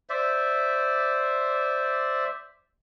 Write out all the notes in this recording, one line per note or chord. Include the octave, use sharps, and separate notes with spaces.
C5 D5 E5